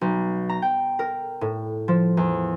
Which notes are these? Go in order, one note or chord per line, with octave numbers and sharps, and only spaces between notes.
B1
A#5
G5
A#4
A2
F3
E2